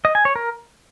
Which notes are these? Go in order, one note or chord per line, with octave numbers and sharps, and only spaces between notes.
D#5
G#5
C#5
A#4